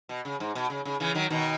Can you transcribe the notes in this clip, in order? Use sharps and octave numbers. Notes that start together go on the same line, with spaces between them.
B2
C#3
G#2
B2
C#3
C#3
C#3 E3
D#3 F#3
B2 D#3